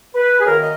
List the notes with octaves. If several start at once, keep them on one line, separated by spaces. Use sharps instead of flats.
B4
G#4
F#2 D#3 A#3 A#4
D#5